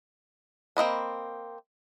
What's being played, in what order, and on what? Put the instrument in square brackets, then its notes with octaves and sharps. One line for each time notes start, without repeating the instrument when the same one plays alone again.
[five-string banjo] A#3 C4 D#5 B5